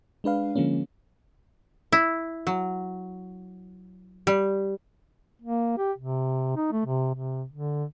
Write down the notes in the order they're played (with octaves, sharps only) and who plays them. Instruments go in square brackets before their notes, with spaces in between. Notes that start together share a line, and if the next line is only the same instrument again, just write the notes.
[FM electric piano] G#3 D4 B4 F5
D3 F3 G#3 A#3 C#4
[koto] E4
F#3
G3
[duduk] A#3
G4
C3
D#4
A3
C3
C3
D3